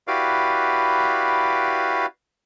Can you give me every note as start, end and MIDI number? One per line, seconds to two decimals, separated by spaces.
0.08 2.06 64
0.08 2.06 66
0.08 2.06 67
0.08 2.06 71
0.08 2.06 74
0.08 2.06 77